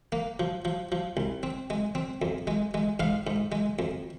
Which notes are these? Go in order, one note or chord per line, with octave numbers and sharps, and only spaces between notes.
A#3
F3
F3
F3
C2
C4
G#3
C4
F2
G#3
G#3
G#2 F5
G#2
G#3
F2